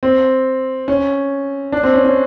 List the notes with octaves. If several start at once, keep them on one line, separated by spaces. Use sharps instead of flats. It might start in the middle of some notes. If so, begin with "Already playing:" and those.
C4
C#4
D4
C4
C#4
C#4